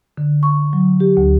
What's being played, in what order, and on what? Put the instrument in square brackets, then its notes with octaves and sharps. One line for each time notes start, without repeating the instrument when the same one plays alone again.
[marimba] D3
C#6
F#3
G4
D2